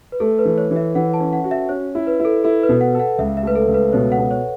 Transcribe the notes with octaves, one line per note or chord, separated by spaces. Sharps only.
B4
A3 A4
B4
E3
C#5
E3
E5
E3 F#5
A5
C#4
F#5
F#4
E5
C#4 C#5
E4
B4
E4
A4
E4 A4
B4
B2
F#5
A4
F#5
C#2 E5
E5
A3 B4
A4
C#2
B4
B2 C#5
F#5
B2
C#5